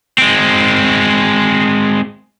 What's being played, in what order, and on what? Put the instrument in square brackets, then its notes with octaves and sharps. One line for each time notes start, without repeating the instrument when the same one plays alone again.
[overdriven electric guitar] G#3 C4